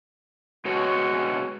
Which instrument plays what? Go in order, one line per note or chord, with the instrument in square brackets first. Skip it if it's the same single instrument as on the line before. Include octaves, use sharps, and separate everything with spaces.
[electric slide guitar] B2 G#3 C#5 [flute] F#4